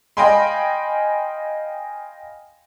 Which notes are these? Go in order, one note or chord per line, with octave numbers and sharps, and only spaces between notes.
D#5 F5 G5 G#5 B5 C6